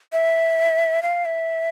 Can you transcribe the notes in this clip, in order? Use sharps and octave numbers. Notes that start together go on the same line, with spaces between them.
E5
F5
E5